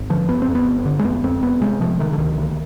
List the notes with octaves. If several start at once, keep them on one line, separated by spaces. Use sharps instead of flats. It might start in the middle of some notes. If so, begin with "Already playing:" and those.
Already playing: G#1
D3 F3
G1 B3
C4
F2
B3
G1
D3
G#3
F1 B3
F2 C4
F1 B3
C3 G#3
C3 F3
C3 D#3
D3
D2 D#3
D2